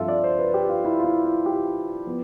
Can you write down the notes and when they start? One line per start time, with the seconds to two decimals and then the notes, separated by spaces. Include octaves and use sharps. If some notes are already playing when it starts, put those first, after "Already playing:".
Already playing: G2 F3 C4 F4 A4 E5
0.08 D5
0.24 C5
0.39 B4
0.54 G4
0.69 F4
0.85 E4
0.99 F4
1.04 E4
1.25 F4
1.46 G4
2.07 F3 B3